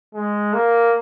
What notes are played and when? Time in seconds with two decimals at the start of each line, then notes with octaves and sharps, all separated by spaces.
0.14 G#3
0.54 A#3